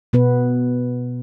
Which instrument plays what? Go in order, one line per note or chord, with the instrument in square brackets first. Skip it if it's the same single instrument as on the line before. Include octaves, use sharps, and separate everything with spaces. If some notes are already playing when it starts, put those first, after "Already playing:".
[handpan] B2 B3 B4